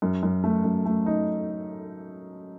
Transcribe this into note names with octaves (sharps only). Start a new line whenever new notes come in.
F#2
F#2
A3
F#2
A3
D#4